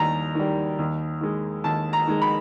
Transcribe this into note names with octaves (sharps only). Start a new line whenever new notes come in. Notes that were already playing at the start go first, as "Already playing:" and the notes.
Already playing: D#2 G3 A#5
D#3 G3
D#2
D#3 G#3
D#2 A5
A#5
D#3 G#3
B5